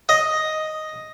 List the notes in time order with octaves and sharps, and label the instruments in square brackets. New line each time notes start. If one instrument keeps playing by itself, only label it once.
[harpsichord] D#5